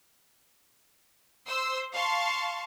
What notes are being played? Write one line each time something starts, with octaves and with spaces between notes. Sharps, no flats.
C5 C6 E6
F5 A5 C6 C#6